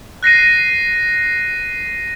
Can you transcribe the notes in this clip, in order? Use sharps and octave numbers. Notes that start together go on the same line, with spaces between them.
F#6 A#6 C7 D#7